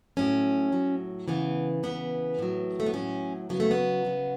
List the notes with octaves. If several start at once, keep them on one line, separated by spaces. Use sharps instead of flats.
A2 F#3 C#4
A2 F#3
C#3 E3 B3
C#3 E3 B3
A2 F#3
A3
B3
A2 F#3 C#4
C#3 F#3 B3
A3
B3
C#3 F#3